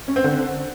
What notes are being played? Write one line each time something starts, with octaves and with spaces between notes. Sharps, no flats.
C#4
C4
D3